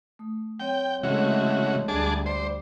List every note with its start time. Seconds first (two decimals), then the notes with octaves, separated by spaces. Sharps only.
0.19 A3 D#6
0.60 F#3 C4 C#5 G5
1.03 C#3 E3 G#3 A3 F#4
1.88 D2 G3 D4 G#4 A5
2.26 C5 D5 D6